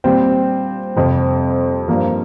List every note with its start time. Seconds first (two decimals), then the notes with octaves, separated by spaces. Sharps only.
0.04 A#2 G3 C4
0.96 F2 C3 G3
1.88 G2 F3 A#3